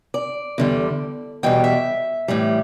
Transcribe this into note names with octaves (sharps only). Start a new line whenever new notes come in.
D5
E2 D3 G3
E2 B2 G3 G5
E5
A2 E3 G3